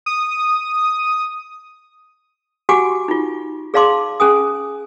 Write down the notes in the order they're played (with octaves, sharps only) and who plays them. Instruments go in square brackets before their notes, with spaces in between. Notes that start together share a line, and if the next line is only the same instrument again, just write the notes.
[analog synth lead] D#6
[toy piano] F#4 G4 F#5 G#5 D6
D#4 F4
G#4 D5 F5 A5 C6 D6
C#4 G#4 G#5 D#6